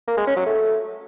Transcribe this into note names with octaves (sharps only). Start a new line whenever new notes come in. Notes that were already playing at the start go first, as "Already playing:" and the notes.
A#3
G#3
C#4
F#3
A3